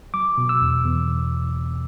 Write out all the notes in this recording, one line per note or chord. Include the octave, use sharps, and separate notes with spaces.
F#3 D6
B2
E6
E2
E2